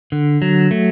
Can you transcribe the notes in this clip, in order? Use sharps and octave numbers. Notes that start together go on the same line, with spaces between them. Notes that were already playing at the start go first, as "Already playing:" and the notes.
D3
F#3
A3